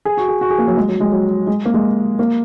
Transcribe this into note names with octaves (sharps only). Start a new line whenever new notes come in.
G#4
F#4
G#4
F#4
G#4
A#3
F#3
G#3
F#3
G#3
F#3
G#3
A#3
G#3
A#3